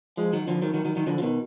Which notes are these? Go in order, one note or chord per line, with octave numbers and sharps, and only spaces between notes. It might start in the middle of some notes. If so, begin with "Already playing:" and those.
F3 G#3
D#3 F#3
D3 F3
D#3 F#3
D#3 F#3
D#3 F#3
D#3 F#3
D3 F3
F3
B2 D#3